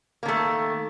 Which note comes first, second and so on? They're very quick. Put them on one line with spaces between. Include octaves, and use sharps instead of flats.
A#3 D#3 A3